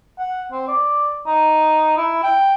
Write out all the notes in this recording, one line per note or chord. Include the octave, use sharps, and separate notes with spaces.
F#5
C4
D5
D#4
E4
G5